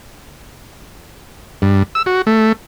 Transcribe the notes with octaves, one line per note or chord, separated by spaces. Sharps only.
G2
E6
F#4
A3